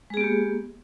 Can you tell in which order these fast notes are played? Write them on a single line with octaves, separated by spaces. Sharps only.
G#3 G#4 B3 G4 A#3